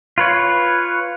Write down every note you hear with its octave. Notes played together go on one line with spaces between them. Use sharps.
F4 B4 C#5